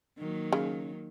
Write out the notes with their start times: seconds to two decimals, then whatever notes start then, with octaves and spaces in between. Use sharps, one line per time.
0.18 D#3 F#3 A#3
0.53 C#3